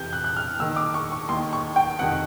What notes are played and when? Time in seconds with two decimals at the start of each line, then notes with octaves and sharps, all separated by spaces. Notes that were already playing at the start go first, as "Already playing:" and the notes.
Already playing: F2 C3 E3 G6
0.13 F#6
0.24 F#6
0.36 F6
0.59 D#2 D#3 E6
0.76 D6
0.94 C#6
1.12 C#6
1.29 D#2 D#3 C6
1.53 C#6
1.76 G5
1.99 F2 C3 D#3 F#5